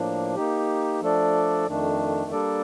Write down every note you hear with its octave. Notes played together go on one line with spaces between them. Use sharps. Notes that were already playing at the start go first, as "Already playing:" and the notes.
Already playing: A2 F3 A#3 D4
A#3 D#4 G4
F3 A3 D4 A4 D5
F2 D#3 A3 D4
G3 A#3 D4 A4 D5